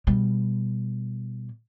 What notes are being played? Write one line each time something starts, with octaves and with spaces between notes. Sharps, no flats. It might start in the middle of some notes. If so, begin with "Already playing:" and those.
B2 G3